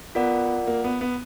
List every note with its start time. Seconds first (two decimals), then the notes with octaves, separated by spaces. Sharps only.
0.15 B3 F4 A#4 D5 F#5
0.67 A#3
0.84 B3
1.01 B3